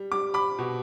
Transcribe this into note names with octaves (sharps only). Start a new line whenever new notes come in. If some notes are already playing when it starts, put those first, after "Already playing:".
Already playing: G3
G3 D6
B5 D6
B2